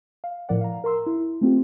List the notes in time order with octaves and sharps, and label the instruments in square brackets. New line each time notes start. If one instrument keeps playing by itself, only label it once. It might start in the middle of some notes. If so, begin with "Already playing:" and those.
[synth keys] F5
A2 F3 A#4 D5 F#5
F5 A#5
A#4 A#5 C6 E6
E4
A3 C4 F4 G4